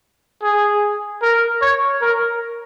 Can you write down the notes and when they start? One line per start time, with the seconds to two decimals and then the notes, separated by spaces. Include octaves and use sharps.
0.42 G#4
1.22 A#4
1.62 C#5
2.01 A#4